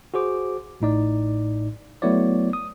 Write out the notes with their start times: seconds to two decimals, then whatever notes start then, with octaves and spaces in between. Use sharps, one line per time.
0.14 F#4 G#4 C5 D6
0.80 A1 A2 D#4 D5
2.02 F#3 A3 B3 E4 C#5 D5
2.53 D#6